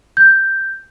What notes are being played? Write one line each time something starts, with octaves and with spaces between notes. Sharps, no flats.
G6